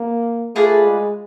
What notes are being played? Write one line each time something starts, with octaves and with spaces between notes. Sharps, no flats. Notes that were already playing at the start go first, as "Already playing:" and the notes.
Already playing: A#3
A3 F4 G#4 B4 D5
G#3